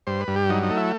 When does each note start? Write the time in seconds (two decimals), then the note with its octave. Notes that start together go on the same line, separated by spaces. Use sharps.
0.07 G2 C5
0.20 B4
0.28 G2
0.36 G4
0.49 F#3 D#4
0.63 D#4
0.70 A3
0.77 E4